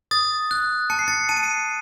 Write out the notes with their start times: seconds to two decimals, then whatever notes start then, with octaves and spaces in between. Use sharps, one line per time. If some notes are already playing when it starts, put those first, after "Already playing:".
0.11 D#6 A6
0.51 F#6
0.90 A5 C#7
0.99 C7
1.08 A6 C#7
1.29 A5 D#7
1.37 C#7
1.43 C7 D#7